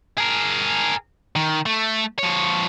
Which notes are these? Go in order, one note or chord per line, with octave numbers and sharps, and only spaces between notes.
G#4 A#4
D#3
A3
F3 C#5